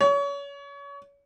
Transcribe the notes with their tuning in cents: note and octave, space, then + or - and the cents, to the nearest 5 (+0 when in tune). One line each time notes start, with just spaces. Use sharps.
C#5 +30